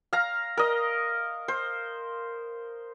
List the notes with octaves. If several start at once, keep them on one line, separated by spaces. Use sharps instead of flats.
F5 A#5
A#4 D#5
C5